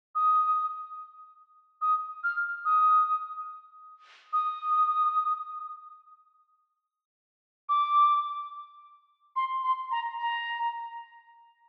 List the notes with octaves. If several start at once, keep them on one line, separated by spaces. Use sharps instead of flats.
D#6
D#6
F6
D#6
D#6
D6
C6
C6
A#5
A#5